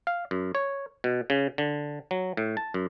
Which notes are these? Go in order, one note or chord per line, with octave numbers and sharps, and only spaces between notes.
F5
F#2
C#5
B2
C#3
D3
F#3
A2
A5
F#2